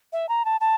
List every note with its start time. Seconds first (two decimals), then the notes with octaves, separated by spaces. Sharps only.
0.13 E5
0.29 A#5
0.45 A5
0.61 A5